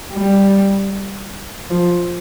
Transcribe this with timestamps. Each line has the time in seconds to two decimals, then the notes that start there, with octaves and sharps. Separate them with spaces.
0.13 G3
1.70 F3